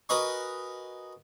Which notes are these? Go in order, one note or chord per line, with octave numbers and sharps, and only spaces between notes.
F#4 A#4 B4 D#5 G#5 C#6